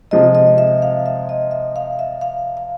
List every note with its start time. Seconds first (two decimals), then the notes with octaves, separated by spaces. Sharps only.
0.11 C3 F3 G#3 D#5
0.35 D#5
0.58 E5
0.82 F5
1.06 E5
1.29 D#5
1.51 E5
1.76 F5
1.99 E5
2.21 F5
2.57 F5